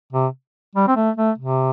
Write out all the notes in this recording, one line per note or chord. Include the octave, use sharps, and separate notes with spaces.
C3
G3
C4
A3
A3
C3